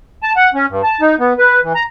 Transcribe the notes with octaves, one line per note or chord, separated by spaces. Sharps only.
A5
F#5
C#4
G2
A5
D#4
B3
B4
E3
A#5